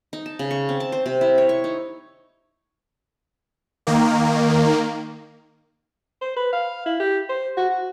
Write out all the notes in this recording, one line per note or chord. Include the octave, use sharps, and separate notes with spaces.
D#4
A5
C#3
C#6
C4
A5
C5
C3
E4
C#5
C#6
D#4
D#3 A#3
C5
B4
F5
E4
G4
C5
F#4
F#4